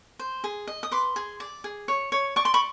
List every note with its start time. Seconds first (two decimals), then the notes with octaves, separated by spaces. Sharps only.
0.19 C5
0.44 G#4
0.67 D#5
0.83 D#6
0.91 B4 C6 D6
1.16 G#4
1.40 D5
1.64 G#4
1.88 C#5
2.12 C#5
2.36 D5 C#6
2.45 C6
2.54 B5 C#6